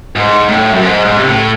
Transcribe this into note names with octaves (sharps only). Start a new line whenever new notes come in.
G#2
A2
F#2
G#2
G#2
C3
A2